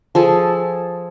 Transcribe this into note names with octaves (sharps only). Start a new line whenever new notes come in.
F3 G#4 A4